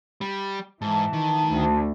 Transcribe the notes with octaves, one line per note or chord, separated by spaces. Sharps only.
G3
G#2 E3 A5
D#3
D2